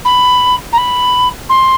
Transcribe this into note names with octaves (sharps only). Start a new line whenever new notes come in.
B5
A#5
B5
C6